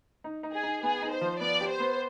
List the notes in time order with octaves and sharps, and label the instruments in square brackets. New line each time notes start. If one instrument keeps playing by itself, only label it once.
[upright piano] D#4
D#4
[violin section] G#4
[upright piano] D#4
[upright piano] B3 [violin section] G#4
[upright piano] D#4
[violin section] C5
[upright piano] F3
[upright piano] B3 [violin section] D5
[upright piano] G4
[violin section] C5
[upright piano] B3